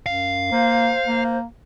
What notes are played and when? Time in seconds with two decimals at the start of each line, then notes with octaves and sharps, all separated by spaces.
0.06 F#2 F5
0.51 A#3 C5
1.07 A#3